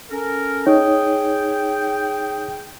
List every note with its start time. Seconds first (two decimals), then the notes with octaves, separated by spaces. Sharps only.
0.10 C#4 A4 A#4
0.67 D#4 G#4 C#5 G5